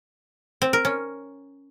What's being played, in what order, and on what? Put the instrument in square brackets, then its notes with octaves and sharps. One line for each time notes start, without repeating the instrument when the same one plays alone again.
[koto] C4
A#4
C#4